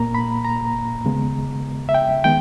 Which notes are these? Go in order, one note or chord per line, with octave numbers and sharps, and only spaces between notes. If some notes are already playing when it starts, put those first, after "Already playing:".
Already playing: A#2 A#3 A#5
B5
A#5
D#2 C#3 G#3 B3
E5
G5
D#3 G#3 B3 G5